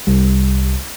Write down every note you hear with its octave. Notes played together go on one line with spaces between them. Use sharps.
C2 G3